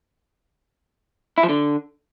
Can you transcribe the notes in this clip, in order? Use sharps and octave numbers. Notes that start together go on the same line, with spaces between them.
E4
F3
D3